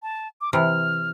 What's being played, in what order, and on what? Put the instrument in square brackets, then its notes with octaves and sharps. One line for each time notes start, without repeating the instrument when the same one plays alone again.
[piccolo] A5
D6
[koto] C3 E3 [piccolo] F6